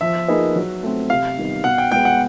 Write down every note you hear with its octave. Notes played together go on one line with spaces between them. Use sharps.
F3 E5
A#3 D#4 G#4 B4
F#3
A3 C4
C3 F5
D#3 G3 B3 D#4
B2 F#5
G5
G#3 B3 G5
F#5